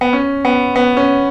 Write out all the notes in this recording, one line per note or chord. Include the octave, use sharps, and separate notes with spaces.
B3
C#4
B3
B3
C#4